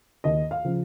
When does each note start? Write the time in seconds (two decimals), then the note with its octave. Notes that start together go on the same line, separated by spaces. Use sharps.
0.24 D#2 D#5
0.51 F5
0.65 C#3 F3